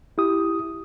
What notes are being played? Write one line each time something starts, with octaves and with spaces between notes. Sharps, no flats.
E4 G4 D#6